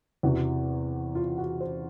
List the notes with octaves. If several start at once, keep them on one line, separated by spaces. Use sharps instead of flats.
E2 C3 E3 F#4
F4
F#4
C5